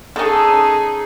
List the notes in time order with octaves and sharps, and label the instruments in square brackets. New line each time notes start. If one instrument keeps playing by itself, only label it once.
[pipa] C#4 A4 [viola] D#4 G#4